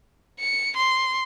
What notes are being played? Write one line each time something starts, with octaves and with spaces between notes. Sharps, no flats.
C#7
C6